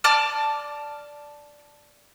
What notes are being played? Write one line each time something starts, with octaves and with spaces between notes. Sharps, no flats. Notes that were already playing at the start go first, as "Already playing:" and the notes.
D5 A5 D6 F6